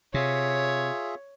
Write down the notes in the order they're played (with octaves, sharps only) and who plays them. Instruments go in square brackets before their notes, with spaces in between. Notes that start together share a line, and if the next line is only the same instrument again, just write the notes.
[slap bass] C3 [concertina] F4 G#4 E5 [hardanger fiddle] C#5